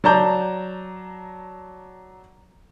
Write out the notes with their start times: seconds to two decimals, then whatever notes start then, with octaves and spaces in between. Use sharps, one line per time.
0.04 F#3 D5 A5 A#5 G6